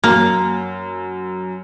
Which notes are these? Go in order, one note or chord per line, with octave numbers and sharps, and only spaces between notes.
F#2 A#3